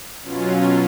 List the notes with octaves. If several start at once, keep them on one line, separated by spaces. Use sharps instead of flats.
B2 F#3 C#4 F4